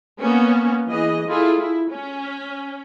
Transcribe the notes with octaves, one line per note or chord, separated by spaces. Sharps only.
A#3 B3 C#4
E3 G#4 D#5
E4 F4 G#4 A4
E4
C#4